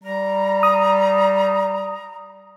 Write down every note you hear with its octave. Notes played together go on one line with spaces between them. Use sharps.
G3 A#5
D#6